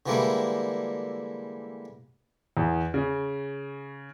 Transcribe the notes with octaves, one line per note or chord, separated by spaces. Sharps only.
D3 E3 G3 G#3 A#3 E4
E2
C#3